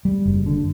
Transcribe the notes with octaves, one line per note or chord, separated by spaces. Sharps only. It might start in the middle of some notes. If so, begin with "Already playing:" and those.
G3
F#1
D3